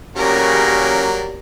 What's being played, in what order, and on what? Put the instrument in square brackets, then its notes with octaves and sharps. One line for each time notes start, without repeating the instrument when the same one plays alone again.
[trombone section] A1 C#3 [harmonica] F#3 A#3 [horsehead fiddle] G4 D5 [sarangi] A#4